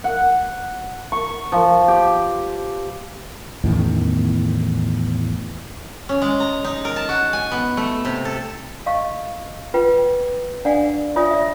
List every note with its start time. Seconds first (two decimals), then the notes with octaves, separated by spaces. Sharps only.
0.04 F#5
1.12 C#6
1.52 F3
1.88 G4
3.64 E2 A2 D#3 C#4
6.09 C#4
6.22 G#3
6.40 A#5
6.65 D#4
6.85 A#4
6.96 A5
7.09 F#4
7.33 G#5
7.51 B3
7.77 A3
8.05 C3
8.25 A4
8.86 D#5 F5 C#6
9.74 F4 B4 F#5 G5
10.65 D4 D5 F5 F#5 G#5
11.16 F4 C#5 D5 E5 G#5 D#6
11.31 D5 E5